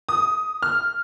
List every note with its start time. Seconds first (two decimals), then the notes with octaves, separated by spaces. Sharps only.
0.09 D#6
0.62 F6